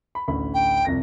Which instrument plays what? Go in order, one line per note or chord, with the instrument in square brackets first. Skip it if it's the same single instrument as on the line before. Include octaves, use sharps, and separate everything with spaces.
[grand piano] B5
A1 D2 B5
[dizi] G5
[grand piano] C2 F2 A#6